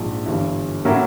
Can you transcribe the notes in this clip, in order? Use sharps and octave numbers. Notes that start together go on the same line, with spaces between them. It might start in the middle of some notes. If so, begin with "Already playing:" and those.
Already playing: A#1 G#2 F3
G1 G2 E3
A2 F#3 A#3 C#4 E4